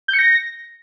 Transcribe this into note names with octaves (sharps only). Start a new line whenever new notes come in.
G6
C#7
A#6